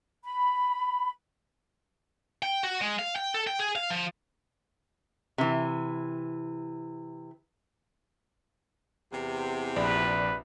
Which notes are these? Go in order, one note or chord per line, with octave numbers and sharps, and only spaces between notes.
B5
G5
F#4
G#3
F5
G5
A4
G5
G#4
F5
F3
C3 E3
E2 C3
A#1 B4 D5